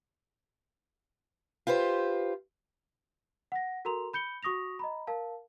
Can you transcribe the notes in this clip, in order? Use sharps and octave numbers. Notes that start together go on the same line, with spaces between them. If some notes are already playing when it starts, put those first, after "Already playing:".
F4 G4 B4 C5
F#5 A#6
F#4 A4 A#4 A#5 C6 F7
B5 G6 C#7 G7
F#4 C#6 D#6 A#6 F7
D#5 A#5 B5
A#4 F5 A5